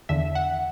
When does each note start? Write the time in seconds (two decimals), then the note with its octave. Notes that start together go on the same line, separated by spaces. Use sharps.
0.09 E2 D3 E5
0.35 F#5